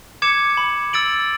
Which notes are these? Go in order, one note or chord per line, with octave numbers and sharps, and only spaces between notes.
D6 G#6 C#7 E7
B5
E6 A6 D7 F#7